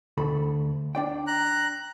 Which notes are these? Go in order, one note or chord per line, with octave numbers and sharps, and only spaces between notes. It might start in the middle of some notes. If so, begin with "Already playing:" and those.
D2 A4 B5
D4 D5 G5
A#5 F#6